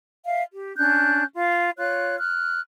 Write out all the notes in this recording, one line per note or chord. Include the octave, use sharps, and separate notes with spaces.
E5 F5
G4
C#4 D4 F#6 G6
F4
F4 C#5 F#6
F6 F#6